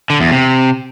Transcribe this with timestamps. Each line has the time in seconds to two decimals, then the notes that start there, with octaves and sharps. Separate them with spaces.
0.10 D3
0.21 E2
0.31 C3